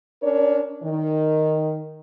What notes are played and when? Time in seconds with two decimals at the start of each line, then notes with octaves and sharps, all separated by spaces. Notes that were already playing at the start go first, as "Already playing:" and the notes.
0.23 C#4 D4 A#4 C#5 D5
0.83 D#3